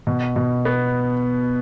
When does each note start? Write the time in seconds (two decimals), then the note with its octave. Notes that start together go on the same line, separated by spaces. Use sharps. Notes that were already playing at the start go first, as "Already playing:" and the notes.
0.07 B2
0.36 B2
0.65 B3